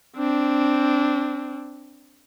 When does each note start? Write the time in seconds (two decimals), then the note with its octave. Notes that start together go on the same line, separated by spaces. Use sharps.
0.16 C4 D4